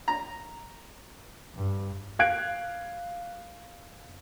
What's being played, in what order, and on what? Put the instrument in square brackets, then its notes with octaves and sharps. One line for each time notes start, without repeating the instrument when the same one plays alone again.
[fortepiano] A#5
[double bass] G2
[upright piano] F5 F#6 G#6 D7